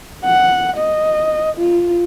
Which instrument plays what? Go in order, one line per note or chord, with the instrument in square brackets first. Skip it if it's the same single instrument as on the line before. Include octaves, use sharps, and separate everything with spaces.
[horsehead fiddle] F#5
D#5
F4